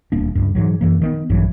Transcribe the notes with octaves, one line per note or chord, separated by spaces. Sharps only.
D#1 A#3 D4
C#2 G2
G#2 E3 F#3
F#2 E3 A#3
D#3 G#3 B3
A#1 G2 E3 F#3